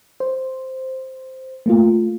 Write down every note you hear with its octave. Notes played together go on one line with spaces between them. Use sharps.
C5
A3 A#3 F4